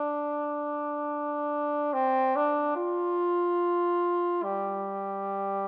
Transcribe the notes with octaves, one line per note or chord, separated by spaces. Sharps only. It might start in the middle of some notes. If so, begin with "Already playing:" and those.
Already playing: D4
C4
D4
F4
G3